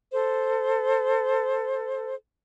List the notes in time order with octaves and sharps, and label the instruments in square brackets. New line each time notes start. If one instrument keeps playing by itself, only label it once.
[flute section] A4 C5